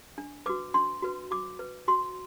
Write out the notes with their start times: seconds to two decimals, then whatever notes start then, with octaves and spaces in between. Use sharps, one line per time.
0.18 D4
0.46 F#4 B4 D6
0.74 D4 C6
1.02 F#4 B4
1.31 F#4 D6
1.59 B4
1.88 F#4 C6